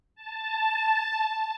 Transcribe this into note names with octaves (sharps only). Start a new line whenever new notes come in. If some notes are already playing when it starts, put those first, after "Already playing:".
A5